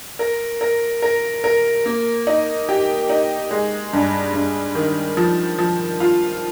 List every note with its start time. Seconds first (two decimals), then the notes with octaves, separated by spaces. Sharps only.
0.19 A#4
0.61 A#4
1.02 A#4
1.44 A#4
1.86 A#3
2.27 D#4
2.69 G4
3.09 D#4
3.51 G#3
3.93 G2
4.34 G2
4.75 D#3
5.17 F3
5.58 F3
6.00 F4